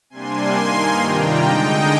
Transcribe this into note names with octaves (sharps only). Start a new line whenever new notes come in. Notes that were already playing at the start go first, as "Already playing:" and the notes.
C3 G3 A#3 D4 G#5 C6
G2 D#3 A#3 D#4
C3 D#3 G3 D4 F4 G5 A#5
D3 G#3 D#4 D#5 G5